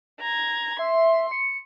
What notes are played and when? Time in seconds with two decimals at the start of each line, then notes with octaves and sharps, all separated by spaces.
0.20 A#5 G#6
0.79 E5 C6
1.31 C#7